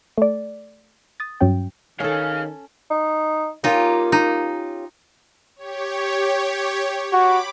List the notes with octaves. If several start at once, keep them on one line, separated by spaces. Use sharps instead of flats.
A3 D5
D#6 A6
G2 F#3 C#4 G5
D#3 C#4 A4 C#5 F5 F6
D#4
A#3 C#4 D#4 F4 G4
D#4
G4 C#5
F#4 B5 D6